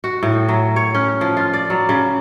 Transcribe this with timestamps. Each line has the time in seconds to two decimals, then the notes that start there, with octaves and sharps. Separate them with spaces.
0.04 F#4
0.23 A2
0.48 F#3
0.76 C#5
0.94 C#4
1.21 F3
1.37 F4
1.53 D5
1.70 F#3
1.89 C#3